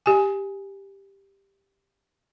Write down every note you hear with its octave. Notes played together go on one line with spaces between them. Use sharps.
G4 G#5